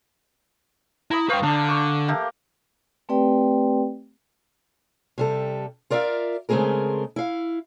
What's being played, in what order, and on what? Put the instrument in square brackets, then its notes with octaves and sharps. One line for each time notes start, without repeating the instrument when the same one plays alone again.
[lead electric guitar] E4 [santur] A#5 B5 D#6
[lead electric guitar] B4 G5 [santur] C5 F5 C#6
[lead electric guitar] D3 [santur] D4
[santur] C#6 D6
A3 A#3 G4
[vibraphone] A3 C4 G4 B4 D5 G5
[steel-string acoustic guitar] C3 G3 A4
F4 A#4 D5 E5 F5
C#3 G#3 A3 C4 G#4 A#4
E4 F5